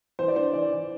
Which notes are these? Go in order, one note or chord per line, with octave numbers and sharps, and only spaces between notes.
E3 C5
D5
D4 C5
E3 D5
E3